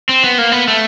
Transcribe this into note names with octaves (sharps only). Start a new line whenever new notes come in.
C4
B3
A#3
B3
A3